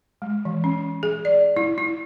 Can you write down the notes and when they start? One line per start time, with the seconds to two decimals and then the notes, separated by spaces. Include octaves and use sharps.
0.22 G#3
0.45 E3
0.64 C#4
1.03 G#4
1.25 D5
1.57 E4
1.78 E4